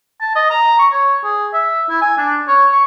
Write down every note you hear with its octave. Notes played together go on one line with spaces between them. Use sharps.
A5
D#5
A#5
C#6
C#5
G#4
E5
E4
G#5
D4
C#5
C#6